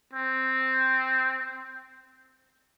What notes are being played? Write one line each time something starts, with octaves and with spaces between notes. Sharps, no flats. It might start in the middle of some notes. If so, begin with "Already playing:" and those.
C4